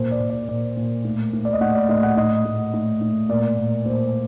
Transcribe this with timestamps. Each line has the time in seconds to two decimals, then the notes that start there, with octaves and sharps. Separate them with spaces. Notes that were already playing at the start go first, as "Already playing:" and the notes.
Already playing: A#2 C5
0.11 D5
0.20 A#2
0.30 D5
0.48 A#2 D5
0.77 A#2
1.05 A2
1.33 A2
1.45 D5
1.53 D#5
1.61 A2 F#5
1.75 D5
1.89 A2 D#5
2.03 F#5
2.17 A2 D#5
2.45 A2
2.74 A2
3.01 A2
3.29 A#2 D5
3.57 A#2
3.86 A#2 C5